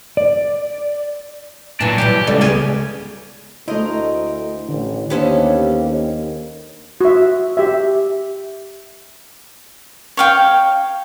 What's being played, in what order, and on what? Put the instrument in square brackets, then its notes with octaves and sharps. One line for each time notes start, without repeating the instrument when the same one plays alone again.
[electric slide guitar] D5
[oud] A#2 E3 [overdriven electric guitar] F#3 D4
[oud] E3 F#3 G3 [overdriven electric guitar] G4
[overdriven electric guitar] C#2 [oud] A4 D5
[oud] B3 C#4 G#4
[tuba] D2 [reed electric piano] A3 E4 [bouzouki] A#4 C5 D#5
[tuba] A1 [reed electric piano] D3
[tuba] D#2 [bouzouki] B3 C#4 A4 [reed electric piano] D4 G4 C5
[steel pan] F#4 E5
G4 E5
[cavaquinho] C#5 F5 G5